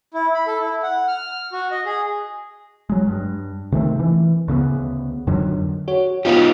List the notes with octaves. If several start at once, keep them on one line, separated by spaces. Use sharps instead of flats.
E4
B5
A4
E4
F#5
F6
F#4
D#5
G#4
F#3 G#3
G2
C3 D#3 A3 C4
E3
D2 C#3 G#3 B3
F2 D3 D#3 F#3
F#4 C#5
B3 D#4 F4 G4 F5